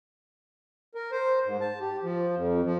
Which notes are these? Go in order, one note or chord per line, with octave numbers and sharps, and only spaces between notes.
A#4
C5
G#2
A5
G4
F3
F2
F3